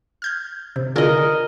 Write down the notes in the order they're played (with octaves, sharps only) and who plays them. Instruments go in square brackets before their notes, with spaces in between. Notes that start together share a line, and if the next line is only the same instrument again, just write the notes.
[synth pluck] F6 G6 G#6
C3
[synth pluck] D3 F4 G#4 [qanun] A#4 D#5